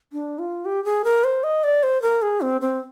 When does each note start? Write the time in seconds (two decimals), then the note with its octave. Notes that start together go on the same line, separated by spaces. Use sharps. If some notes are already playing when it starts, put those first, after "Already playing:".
0.13 D4
0.39 F4
0.65 G4
0.85 G#4
1.04 A#4
1.24 C5
1.44 D#5
1.64 D5
1.83 C5
2.02 A#4
2.22 G#4
2.41 C4
2.61 C4